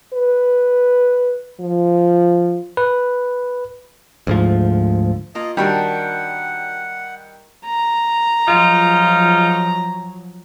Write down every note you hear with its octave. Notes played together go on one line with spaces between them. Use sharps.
B4
F3
B4
D2 G#2 F3
A#3 F4 D#5
D#3 G3 D4 F#4 A#4 F#5
A#5
F3 F#3 G#3 D#4 F4